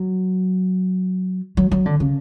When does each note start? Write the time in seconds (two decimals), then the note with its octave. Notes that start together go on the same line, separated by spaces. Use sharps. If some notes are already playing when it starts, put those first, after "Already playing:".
Already playing: F#3
1.57 F#3
1.72 F#3
1.86 D3
2.00 C#3